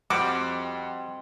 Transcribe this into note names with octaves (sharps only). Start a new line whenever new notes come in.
F2 G3 C4 F#4 D#5 F#5 D6 F6